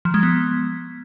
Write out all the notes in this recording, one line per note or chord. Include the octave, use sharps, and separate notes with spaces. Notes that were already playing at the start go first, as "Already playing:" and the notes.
F3
G#3
B3